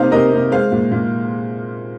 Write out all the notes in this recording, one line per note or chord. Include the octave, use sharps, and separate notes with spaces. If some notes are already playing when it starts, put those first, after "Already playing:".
Already playing: C3 A#3 D#4 C5 F5
C3 A#4 D#5
C3
G#3 C5 F5
A#2
A#2